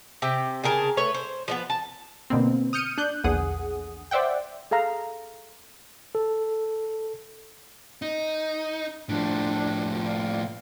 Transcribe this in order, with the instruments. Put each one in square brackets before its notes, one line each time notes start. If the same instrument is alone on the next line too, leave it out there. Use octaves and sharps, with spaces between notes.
[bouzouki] C3 G4 G5
C#3 G#4 A#4 A5
A3 B4 C#5
C5
F3 G#3 B3
A5
[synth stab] B2 D3 A#3 C4
D#6 F6 G6 C#7 D#7
D4 F#6 G6
A#1 E2 D3 G#4 F#5 D#6
C5 D5 E5 F#5 G5
[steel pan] G#4 A4 F5 A#5
[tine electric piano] A4
[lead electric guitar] D#4
[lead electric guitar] A2 F3 [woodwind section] D4
[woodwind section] D5 F5